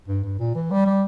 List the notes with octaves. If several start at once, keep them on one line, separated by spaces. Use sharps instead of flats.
G2
G2
A#2
E3
G3
G3